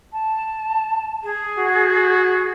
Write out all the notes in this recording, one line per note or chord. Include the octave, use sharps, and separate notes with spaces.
A5
G#4
F#4